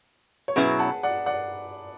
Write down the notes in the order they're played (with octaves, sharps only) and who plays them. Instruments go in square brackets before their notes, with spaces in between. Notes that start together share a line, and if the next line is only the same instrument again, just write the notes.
[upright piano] C#5
[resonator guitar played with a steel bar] B2 F#3 C#4 E4 [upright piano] G#4 B4
[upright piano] F#5 A5
D5 F#5
D5 F#5